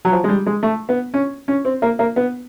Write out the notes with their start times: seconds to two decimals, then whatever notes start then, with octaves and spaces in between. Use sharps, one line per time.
0.05 F#3
0.12 F3
0.24 G#3
0.29 G3
0.46 G#3
0.63 A3
0.89 B3
1.14 C#4
1.48 C#4
1.65 C4
1.82 A#3
1.99 A#3
2.16 B3